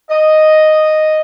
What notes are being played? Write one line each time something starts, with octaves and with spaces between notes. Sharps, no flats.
D#5